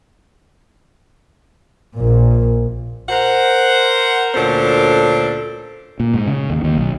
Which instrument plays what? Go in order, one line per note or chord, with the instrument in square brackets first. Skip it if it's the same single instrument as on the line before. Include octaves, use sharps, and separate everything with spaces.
[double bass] A#1 A#2
[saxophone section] A#4 C5 F#5
D2 A#2 C#4 D4 A4 C5
[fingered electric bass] A#2
G#2
C#3
D#2
D#2
B1